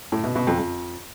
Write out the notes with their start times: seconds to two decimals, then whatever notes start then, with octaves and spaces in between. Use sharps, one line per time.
0.12 A2
0.24 B2
0.36 B2
0.47 F2
0.59 F2